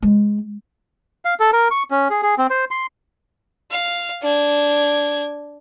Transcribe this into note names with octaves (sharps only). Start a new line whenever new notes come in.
G#3
F5
A4
A#4
C#6
C#4
G#4
G#4
C4
C5
C6
F5
D4 G#6